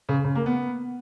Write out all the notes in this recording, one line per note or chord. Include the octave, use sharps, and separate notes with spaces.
C#3
C#3
A#3
B3